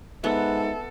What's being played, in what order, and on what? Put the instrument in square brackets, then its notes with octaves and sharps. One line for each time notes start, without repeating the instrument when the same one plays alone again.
[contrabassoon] G#2 [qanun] B3 [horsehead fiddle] A4 [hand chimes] E5